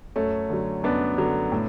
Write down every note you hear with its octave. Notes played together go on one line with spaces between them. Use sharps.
F#2 A3 C#4
D3 F#3
F#2 B3 D4
D3 F#3
A2